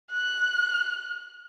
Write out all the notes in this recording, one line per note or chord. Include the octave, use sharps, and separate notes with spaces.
F#6